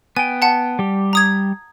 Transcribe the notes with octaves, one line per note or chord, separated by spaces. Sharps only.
B3 G5 G#5
F#5 A5
G3 G4
A#5 D#6 G#6